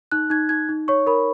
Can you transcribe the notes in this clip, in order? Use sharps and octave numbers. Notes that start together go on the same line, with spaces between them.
D#4 F#6
D#4 G#6
D#4 G#6
D#4
C#5 C#6
A#4 B5